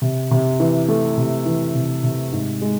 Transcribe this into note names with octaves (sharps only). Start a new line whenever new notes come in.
C3
C3
E3
A3
C3
E3
C3
C3
G#2
G#3